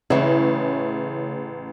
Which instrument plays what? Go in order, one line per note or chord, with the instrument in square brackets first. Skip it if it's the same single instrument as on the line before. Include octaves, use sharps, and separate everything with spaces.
[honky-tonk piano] A1 [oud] C#3 E4